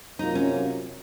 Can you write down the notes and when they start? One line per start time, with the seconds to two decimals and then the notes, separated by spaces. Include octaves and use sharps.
0.19 C3 F#3 A#3 D#4 F4
0.35 C#4